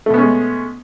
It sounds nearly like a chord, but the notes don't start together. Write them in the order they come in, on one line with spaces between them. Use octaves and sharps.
A3 B2 B3 C#4 G#3